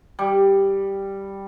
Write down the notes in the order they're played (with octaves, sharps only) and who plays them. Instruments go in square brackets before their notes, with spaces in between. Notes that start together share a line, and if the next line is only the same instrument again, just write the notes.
[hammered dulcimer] G3